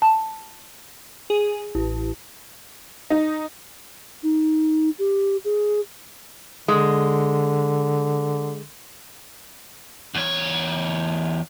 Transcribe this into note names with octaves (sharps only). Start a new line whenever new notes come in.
A5
G#4
A1
D#4
D#4
G4
G#4
D3 G#3
E2 C#5